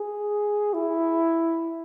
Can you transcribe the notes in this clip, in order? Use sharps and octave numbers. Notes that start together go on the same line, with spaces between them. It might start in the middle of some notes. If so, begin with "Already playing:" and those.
Already playing: G#4
E4